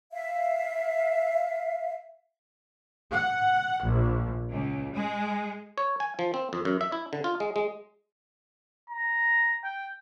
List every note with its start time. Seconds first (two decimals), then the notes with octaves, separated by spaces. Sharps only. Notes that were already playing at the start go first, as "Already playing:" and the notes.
0.12 E5 F5
3.12 F#5
3.82 A#1
4.52 C#2
4.95 G#3
5.78 C#5
6.00 G#5
6.19 F3
6.34 C4
6.53 F2
6.65 F#2
6.81 E5
6.92 E4
7.13 D3
7.24 F4
7.40 G#3
7.56 G#3
8.90 A#5
9.64 G5